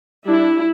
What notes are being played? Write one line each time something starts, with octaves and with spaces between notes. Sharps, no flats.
G3 D4 E4